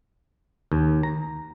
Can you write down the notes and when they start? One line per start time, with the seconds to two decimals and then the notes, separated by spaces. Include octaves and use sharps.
0.72 D#2
1.03 A#5